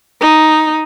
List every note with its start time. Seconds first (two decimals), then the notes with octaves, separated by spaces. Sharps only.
0.21 D#4